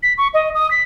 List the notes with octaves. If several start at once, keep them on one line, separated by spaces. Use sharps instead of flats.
B6
C#6
D#5
D#6
B6